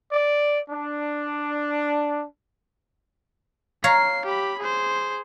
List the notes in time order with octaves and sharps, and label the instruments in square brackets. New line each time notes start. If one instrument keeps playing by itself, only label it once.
[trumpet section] D5
D4
[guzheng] C#5 F5 A#5 [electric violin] C7
[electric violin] G4 B5
G#4 C5